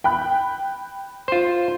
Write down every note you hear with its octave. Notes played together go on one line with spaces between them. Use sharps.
G5 B5 F#6
F4 C5